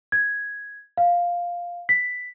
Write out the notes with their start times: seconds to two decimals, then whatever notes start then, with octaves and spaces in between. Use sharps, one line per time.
0.12 G#6
0.97 F5
1.89 B6